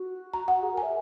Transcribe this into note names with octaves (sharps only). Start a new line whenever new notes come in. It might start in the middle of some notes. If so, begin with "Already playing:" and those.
Already playing: F#4
A#5
F#5
G#4
A#4 G#5
E5